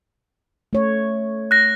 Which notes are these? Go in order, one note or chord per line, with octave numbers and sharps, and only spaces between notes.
A3 C#5
F#6 A#6